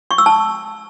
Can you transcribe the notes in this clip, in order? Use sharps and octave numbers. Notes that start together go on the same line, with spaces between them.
C#6
E6
A5